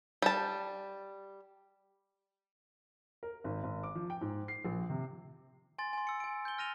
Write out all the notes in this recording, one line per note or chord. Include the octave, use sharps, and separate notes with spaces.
G3 A5
A#4
G#1
G#1
D6
F3
G5
G#2
C7
A#1
C3
G#5 C6 A6
G#5 C6
E6 C#7
G#5 D7
G6 G7
F6 A#6 D#7 F7 G7